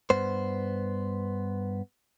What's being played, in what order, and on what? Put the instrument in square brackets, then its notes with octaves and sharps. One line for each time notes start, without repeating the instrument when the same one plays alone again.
[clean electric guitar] G2 B3 C5